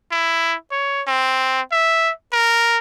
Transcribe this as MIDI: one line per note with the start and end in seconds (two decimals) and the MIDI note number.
0.12 0.56 64
0.72 1.02 73
1.07 1.61 60
1.72 2.11 76
2.33 2.78 70